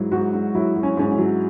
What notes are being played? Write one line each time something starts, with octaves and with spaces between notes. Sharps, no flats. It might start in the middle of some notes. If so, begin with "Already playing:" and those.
Already playing: G#2 F#3 E4
G#2 F#4
G#2
F#3 E4
F#3
C#4
G#2 C#4
C#4
F#3